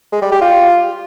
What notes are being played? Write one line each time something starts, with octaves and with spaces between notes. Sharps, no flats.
G#3
G3
G4
F4